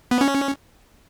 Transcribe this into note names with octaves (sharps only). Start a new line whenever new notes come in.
B3
C#4